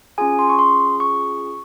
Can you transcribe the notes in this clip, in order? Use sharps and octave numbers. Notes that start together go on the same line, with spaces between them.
C#4 F4 G#4 G#5
C6
C#6
C6
C#6